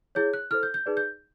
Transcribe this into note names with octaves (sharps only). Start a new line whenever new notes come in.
E4 G#4 C#5 G6
F#6
E4 A4 C5 F6
G6
G6
D#4 G#4 B4 D5
G6